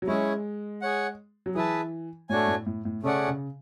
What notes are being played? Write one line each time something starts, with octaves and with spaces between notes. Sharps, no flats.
F#3
G#3 C#4 E4 G#4 C#5
G#4 C#5 F#5
F#3
E3 G#4 B4 E5 A5
A2 A3 D4 F#4 C#5 G#5
A2
A2
A2
C#3 A3 C#4 G#4 D5 F#5
C#3